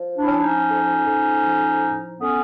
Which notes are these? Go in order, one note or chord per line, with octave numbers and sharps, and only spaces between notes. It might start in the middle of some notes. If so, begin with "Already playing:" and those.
Already playing: F3
D4 E4
C#4
F3 D4
C#4 D#4
F2
F2
F3
A2
A2 B3 C#4